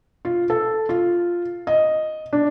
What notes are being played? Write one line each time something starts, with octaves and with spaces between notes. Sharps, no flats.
F4
A4
F4
D#5
D4